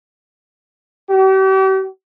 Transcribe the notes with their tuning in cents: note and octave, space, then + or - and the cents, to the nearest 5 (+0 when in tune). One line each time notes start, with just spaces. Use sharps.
G4 -40